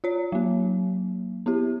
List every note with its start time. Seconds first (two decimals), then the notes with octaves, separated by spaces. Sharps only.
0.04 F4 C#5
0.32 F#3 A#3
1.46 B3 E4 G4